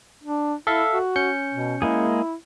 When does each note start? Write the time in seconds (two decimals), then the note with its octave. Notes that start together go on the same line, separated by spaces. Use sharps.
0.23 D4
0.67 E4 A4 E5 F5
0.93 F#4
1.16 C#4 G6 C#7
1.54 B2
1.82 G#3 A#3 E4 G#4